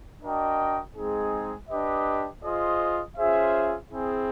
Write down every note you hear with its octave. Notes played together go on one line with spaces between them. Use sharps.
D4 F#4 A#4 D#5 G5
G#3 C4 D#4 G#4
D4 G4 B4 D#5
F4 G#4 C5 D#5
C#4 F4 G#4 C5 E5
C4 E4 G#4